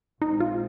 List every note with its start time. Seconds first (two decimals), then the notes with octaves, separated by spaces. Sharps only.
0.21 A#1 A#2 G#3 C4 D#4
0.40 F4